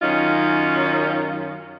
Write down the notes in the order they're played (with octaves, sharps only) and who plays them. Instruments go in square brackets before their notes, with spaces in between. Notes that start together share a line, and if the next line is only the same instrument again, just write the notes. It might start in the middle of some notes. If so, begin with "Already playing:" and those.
[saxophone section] F#2 D#3 C#4 D#4 F4